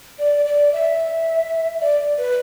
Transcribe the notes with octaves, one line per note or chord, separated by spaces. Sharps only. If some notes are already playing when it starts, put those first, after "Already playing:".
D5
D5
E5
D5
B4